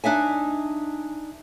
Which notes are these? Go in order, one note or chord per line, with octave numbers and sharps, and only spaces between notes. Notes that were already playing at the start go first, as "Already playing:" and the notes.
D4 D#4 E5 G#5